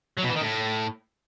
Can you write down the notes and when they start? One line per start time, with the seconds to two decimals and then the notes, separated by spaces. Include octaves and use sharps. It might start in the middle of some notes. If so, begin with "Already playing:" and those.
0.17 F#3
0.23 B2
0.29 E3
0.35 D#3
0.41 A2